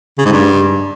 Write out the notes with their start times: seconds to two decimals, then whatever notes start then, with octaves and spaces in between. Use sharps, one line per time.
0.18 C#3
0.25 G#2
0.32 G2